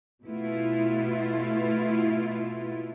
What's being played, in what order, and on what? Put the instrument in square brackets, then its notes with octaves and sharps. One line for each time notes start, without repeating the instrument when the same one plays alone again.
[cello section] B2 A3 B3 E4 F4